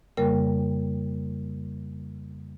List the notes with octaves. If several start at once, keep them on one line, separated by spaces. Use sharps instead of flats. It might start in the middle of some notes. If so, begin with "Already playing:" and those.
F2 C#3 G3 A#3 A#4 G5